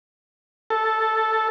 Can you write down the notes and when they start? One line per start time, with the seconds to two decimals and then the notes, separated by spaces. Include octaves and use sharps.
0.70 A4